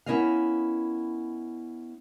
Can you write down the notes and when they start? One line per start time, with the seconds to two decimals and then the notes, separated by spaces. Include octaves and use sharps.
0.06 B3 C#4 E4 A#4 D#5 F5